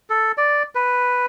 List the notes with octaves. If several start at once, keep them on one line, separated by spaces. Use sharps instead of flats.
A4
D5
B4